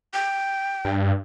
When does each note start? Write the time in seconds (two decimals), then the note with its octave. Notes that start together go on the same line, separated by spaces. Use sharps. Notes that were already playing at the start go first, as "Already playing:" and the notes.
0.14 G5
0.85 G2